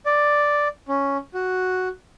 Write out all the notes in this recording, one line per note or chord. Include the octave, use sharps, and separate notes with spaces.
D5
C#4
F#4